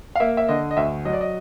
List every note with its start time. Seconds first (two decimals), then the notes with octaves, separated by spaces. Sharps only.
0.15 F5
0.20 A#3 E5
0.37 E5
0.48 D3 D#5
0.71 D#5
0.77 D2 E5
1.05 F#3 D#5
1.13 D5
1.21 D#5